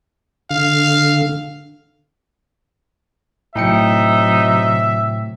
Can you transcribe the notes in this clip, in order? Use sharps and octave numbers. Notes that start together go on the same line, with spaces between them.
D3 F5
A2 C3 F#3 D#4 E5 G5 C#7